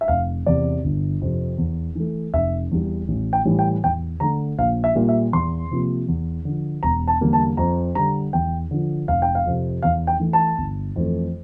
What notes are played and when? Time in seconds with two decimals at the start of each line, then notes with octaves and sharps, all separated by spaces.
0.01 E5
0.08 F1 F5
0.46 E2 C3 D5
0.84 G1
1.22 F2 C3
1.58 E2
1.95 E3 A3
2.33 F1 E5
2.71 E2 E3 G3
3.08 A1
3.33 G5
3.45 A2 E3 G3
3.59 G5
3.83 E2 G5
4.20 D3 A3 A#5
4.58 A#1 F5
4.84 E5
4.95 A#2 G3 A#3
5.09 E5
5.33 E2 C6
5.71 C3 F3 A#3
6.08 E2
6.45 D3 F3
6.83 E1 A#5
7.08 A5
7.21 E2 D3 G3 A#3
7.33 A5
7.57 F2 A#5
7.95 D3 G3 A#5
8.33 E2 G5
8.71 D3 F3
9.08 F1 F5
9.22 G5
9.35 F5
9.46 F2 C3
9.82 E2 F5
10.07 G5
10.20 E3 A3
10.33 A5
10.58 G1
10.96 F2 E3 A3